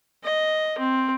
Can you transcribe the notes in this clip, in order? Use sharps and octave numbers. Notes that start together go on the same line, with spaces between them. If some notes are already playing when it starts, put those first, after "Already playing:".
D#5
C4